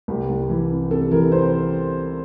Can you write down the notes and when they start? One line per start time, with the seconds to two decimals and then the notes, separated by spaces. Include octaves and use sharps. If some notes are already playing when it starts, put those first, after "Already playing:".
0.08 C2 G4
0.29 C2
0.49 E3
0.70 C3
0.90 C3 A4
1.11 E3 A#4
1.31 C3 C5